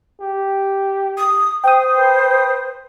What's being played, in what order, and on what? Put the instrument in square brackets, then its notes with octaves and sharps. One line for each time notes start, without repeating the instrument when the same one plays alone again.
[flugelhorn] G4
[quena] D#6
[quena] C5 [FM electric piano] G5 D#6
[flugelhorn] B4